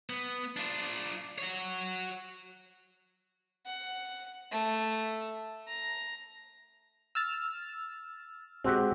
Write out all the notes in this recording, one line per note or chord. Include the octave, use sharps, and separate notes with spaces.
B3
D4 F4
F#4 C#5
F#5
A3
A#5
E6 F6 A6
G#3 C4 F#4 G4